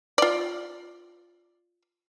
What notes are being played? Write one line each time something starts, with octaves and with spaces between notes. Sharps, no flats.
F4 D5